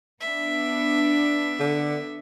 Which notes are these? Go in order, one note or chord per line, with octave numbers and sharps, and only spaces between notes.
B3 D4 E5
D3